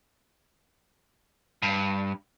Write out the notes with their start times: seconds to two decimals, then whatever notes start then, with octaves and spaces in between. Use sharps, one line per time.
1.62 G2